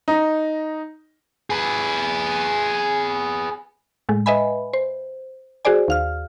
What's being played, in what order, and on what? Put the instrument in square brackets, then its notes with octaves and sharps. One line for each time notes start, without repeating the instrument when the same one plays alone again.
[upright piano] D#4
[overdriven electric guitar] G#4 B4
[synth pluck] A2 G#3
B4 D#5 E5 G#5 B5
C5
F#4 G#4 C5 D5 G#5
D#2 F5 F6